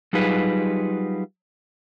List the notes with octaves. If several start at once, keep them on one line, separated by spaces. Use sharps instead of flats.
F#3 G3 D#4 F4 G#4 B4